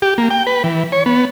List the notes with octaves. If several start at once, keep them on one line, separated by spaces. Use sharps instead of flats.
G4
A#3
G5
B4
E3
C#5
B3